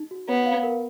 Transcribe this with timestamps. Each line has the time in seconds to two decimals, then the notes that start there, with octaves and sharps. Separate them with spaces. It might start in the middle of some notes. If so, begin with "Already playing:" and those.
Already playing: D#4
0.11 F#4
0.28 B3 C#5
0.46 F5
0.63 A#4